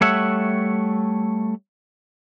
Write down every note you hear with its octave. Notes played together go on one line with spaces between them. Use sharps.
G3 A3 C#5 E5 F#5